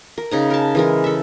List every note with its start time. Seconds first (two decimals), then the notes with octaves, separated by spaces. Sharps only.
0.18 A#4
0.31 C#3 D#4 A#5
0.50 A#4 A5
0.75 E3 G#3 A#4
1.04 A4 E5